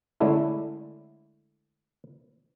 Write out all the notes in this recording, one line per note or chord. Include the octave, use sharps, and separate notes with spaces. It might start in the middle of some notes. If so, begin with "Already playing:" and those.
D3 G#3 A3 C#4 D4 E4